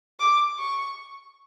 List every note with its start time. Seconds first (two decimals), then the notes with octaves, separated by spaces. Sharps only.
0.20 D6
0.59 C#6